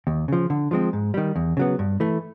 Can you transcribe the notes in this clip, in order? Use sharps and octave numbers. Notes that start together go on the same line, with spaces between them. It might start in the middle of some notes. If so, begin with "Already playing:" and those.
D#2
C#3 F3
D3
F3 G#3 C4
G#2
D#3 G3
E2
C#3 F#3 B3
G2
E3 A3